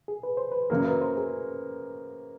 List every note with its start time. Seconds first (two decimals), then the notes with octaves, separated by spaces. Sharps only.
0.08 G#4
0.23 B4
0.37 C5
0.52 B4
0.70 F#2 C#3 F#3 A#3 A#4
0.85 B4
1.01 C5
1.17 G#4